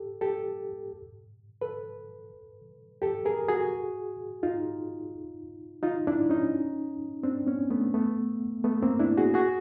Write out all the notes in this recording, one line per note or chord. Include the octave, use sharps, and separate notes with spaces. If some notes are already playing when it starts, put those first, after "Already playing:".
Already playing: G4 A4
G4 A4
A4 B4
G4 A4
G#4 A#4
F#4 G#4
D#4 F4
D#4 F4
D4 E4
C#4 D#4
C4 D4
B3 C#4
A3 B3
A3 B3
A3 B3
A#3 C4
D4 E4
F#4 G#4
F#4 G#4